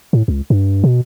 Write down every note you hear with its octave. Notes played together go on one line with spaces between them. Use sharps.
A2
C#2
G2
B2